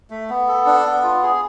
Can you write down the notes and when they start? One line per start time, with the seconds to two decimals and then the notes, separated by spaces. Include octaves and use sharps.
0.10 A3
0.30 B3
0.48 A4
0.66 D4
0.86 B3
1.04 F4
1.23 G#4